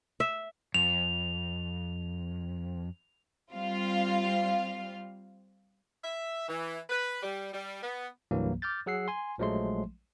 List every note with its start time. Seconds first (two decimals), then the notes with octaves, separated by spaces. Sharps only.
0.20 E5
0.74 F2 F7
3.51 G3 C4 F4 F5
6.04 E5
6.48 E3
6.90 B4
7.23 G3
7.54 G3
7.83 B3
8.31 C2 G2 E3 F#3 A#3
8.62 D6 F6 G6 A6
8.86 F#3 G#4 F#5 E6 C7
9.08 G#5 C6
9.38 A#1 F3 F#3 G#3 A3 C6